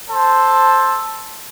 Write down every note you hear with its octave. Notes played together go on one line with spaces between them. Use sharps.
A4 C5 A5